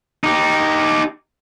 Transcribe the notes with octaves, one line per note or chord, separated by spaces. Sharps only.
D#4 G4